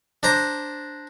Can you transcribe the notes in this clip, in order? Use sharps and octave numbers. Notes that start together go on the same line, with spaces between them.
D4 C5 A#5